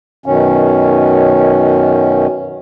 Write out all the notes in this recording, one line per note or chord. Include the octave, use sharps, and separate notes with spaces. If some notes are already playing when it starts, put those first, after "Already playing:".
F#2 B2 D#3 C#4